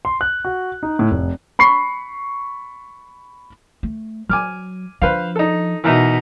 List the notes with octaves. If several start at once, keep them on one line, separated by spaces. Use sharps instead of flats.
C6
F#6
F#4
D#4
A2
F1
B5 C#6 C7
A3
F#3 G#5 D6 F6
F3 D4 B4 C5 F5
D#4 A4
B2 E3 D#4 A#4 E5